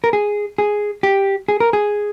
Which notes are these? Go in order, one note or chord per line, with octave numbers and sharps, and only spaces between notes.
A#4
G#4
G#4
G4
G#4
A#4
G#4